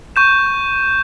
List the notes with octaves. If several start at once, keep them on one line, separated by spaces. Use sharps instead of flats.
C#6 G6 E7